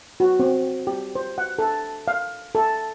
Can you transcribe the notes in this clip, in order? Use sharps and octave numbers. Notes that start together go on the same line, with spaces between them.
F#4
C4
G4
C5
F#5
A4
F5
A4